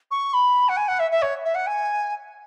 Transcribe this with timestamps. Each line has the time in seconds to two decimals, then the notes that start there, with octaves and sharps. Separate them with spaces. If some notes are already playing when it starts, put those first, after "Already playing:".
0.11 C#6
0.34 B5
0.69 F#5
0.77 G#5
0.88 F#5
0.99 E5
1.11 E5
1.22 C#5
1.45 E5
1.55 F#5
1.67 G#5